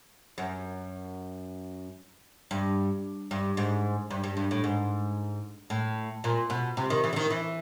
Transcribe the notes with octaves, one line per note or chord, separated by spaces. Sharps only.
F#2
G2
G2
G#2
G2
G2
G2
A2
G#2
A2
A#2
B2
C3
D#3
E3
D3
D#3
E3